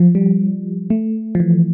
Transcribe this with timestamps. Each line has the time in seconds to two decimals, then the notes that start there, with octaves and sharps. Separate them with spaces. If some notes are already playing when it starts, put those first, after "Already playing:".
Already playing: F3
0.15 G3
0.90 A3
1.35 F3
1.40 E3